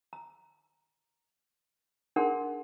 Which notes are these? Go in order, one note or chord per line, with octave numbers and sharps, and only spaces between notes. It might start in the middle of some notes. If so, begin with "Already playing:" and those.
A#5
D4 D#4 G#4 A#4 F#5 C6